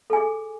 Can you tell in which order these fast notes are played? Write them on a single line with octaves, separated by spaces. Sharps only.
A4 G#5 G#4